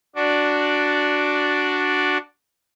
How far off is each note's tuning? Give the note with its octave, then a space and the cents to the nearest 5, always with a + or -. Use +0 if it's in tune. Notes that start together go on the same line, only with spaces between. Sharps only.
D4 +0 F#4 +0 D5 +0